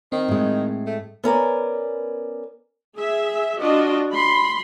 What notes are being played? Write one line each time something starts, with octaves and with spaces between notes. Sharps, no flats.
D#3 C4
A2 G#3
A3
B3 C#4 A#4 D5
G#4 E5
D4 F4 F#4 D#5
B5 C6